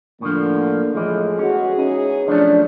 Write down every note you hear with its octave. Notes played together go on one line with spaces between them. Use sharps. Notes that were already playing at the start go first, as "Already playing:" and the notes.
A2 D3 F3 A#3
A2 E3 F3 G#3
E2 C#4 F#4 G#4
C#4 D#4
F3 F#3 A3 D4